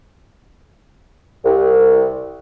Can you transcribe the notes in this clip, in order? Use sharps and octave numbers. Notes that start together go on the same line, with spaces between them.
C2